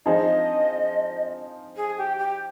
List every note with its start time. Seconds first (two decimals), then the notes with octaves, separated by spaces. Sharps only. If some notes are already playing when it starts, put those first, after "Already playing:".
0.05 F3 C4 D#4 G#4 D#5
1.76 G#4
1.97 G4
2.18 G4